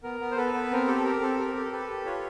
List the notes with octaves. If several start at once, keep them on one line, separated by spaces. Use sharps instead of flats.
B3 A#4
B3
C5
B3 A4 B4
B3
C4 A#4
G4 A4
A4
G4 A#4
C4 A4
G4 A#4
G4 A4
A#4
G4 A4 B4
G4
F4 B4 C#5